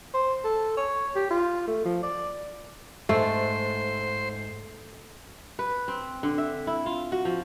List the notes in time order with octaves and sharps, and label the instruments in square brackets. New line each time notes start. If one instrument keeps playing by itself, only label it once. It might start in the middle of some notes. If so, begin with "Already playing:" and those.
[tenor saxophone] C5
A4
C#5
G4
F4
A3
F3
D5
[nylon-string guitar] G#2 [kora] A3 [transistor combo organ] C5
[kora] B4
C4
D3
E5
E4
F4
F#4
F3